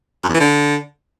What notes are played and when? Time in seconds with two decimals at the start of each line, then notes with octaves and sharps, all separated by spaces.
0.24 F#2
0.29 E2
0.35 E3
0.40 D3